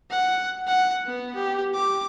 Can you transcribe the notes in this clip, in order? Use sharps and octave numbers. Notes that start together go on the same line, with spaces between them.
F#5
F#5
B3
G4
D6